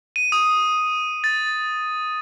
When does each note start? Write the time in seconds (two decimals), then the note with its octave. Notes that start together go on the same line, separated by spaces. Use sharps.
0.16 D#7
0.32 D#6
1.24 A6